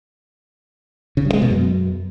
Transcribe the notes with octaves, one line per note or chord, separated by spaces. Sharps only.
C#3
G2
G#3
B2
F#2